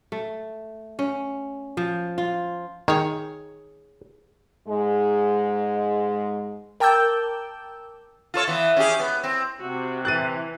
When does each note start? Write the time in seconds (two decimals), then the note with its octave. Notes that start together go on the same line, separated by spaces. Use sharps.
0.12 A3
0.99 C#4
1.77 F3
2.18 F4
2.88 D#3 G#4 C#5
4.68 G#2 G#3
6.80 A#4 G5 A5 D6 E6 G6
8.34 F4 A4 C#5
8.48 E3 B3
8.77 C#4 G4 G#4
9.00 B3
9.24 C4
9.60 C3 F#4
10.05 E3 F#6 A6 D#7